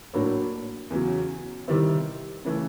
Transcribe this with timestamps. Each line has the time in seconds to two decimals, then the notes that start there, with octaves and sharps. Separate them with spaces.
0.13 A2 F#3 A#3 D4
0.90 E2 C#3 F#3
1.68 C3 D#3 G3 C4 E4
2.45 C#3 E3 A3